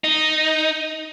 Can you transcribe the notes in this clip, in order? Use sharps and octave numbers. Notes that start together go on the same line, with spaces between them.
D#4